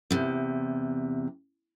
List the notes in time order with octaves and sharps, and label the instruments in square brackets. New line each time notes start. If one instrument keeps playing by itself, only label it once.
[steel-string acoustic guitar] E2 C3